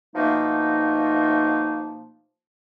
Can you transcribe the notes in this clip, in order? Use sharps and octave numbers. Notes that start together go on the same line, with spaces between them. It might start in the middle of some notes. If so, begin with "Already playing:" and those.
B2 F3 A3 A#3 D#4